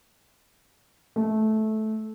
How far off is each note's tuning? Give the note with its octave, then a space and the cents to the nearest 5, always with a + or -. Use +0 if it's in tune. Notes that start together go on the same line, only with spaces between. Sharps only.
A3 -15